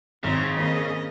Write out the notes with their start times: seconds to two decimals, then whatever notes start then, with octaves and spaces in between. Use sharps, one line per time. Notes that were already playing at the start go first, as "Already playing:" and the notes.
0.24 G#1 C#3 C4 A#5
0.57 D#3 A#3 C4 D#5